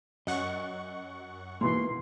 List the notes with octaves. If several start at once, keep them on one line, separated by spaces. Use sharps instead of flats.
F#2 D#5 F#5 C#6
G#2 B2 E3 A#3 C6